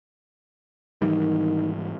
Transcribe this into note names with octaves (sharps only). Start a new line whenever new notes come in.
G#2 D#3 E3 G3